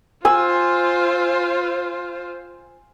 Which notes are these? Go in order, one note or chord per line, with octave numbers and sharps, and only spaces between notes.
F4 C5 G#5 E6